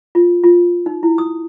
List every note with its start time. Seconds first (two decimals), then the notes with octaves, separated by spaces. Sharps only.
0.15 F4
0.44 F4
0.86 D#4
1.03 E4
1.18 D#6